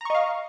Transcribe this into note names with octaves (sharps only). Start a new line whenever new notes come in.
D#5 F5 A#5 C#6